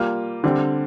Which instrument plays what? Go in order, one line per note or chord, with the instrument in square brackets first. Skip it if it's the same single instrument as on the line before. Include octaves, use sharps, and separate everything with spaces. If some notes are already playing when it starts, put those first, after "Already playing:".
Already playing: [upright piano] G3 A#3 F4
D3 G3 C4